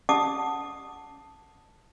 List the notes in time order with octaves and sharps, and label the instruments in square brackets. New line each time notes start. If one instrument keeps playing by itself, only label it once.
[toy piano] F#5 A5 D6 D#6